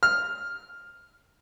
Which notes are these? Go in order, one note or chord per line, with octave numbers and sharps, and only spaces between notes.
F6